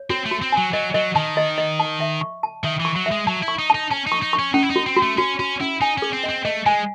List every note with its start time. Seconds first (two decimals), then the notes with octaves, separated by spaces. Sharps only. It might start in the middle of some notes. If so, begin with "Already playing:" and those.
Already playing: C#5
0.10 C4 F#4
0.26 A3
0.31 F#4
0.42 C4
0.52 F#3 G#5
0.73 F#3 D#5
0.94 F#3 D#5
1.16 D#3 A5
1.37 D#5
1.58 D#5
1.80 A5
2.00 E5
2.21 C#6
2.43 A5
2.64 D#3 E5
2.80 E3
2.85 C#6
2.96 F#3
3.06 E5
3.11 G#3
3.27 F#3 A5
3.43 E4
3.48 C#6
3.59 D#4
3.70 D#4 A5
3.91 C#4 A5
4.07 D#4
4.12 C#6
4.22 D#4
4.33 C#6
4.39 C#4
4.54 C#4 D#4
4.63 E4
4.70 D#4
4.76 F#4
4.86 C4
4.96 F#4
5.02 A3
5.18 C#4 F#4
5.39 C#4 F#4
5.60 C#4 E4
5.81 D#4 G#5
5.98 C#4 G#4
6.13 C4
6.23 D#5
6.29 C4
6.45 A3 D#5
6.66 G#3 G#5